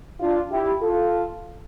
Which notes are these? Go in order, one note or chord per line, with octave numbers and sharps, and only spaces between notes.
D4 F4
E4 G4
F4 A4